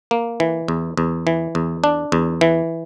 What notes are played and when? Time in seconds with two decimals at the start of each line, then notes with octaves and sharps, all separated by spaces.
0.11 A#3
0.40 E3
0.68 E2
0.97 E2
1.27 E3
1.55 E2
1.84 D4
2.12 E2
2.41 E3